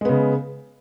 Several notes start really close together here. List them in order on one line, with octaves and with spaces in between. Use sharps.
G#3 B3 C#3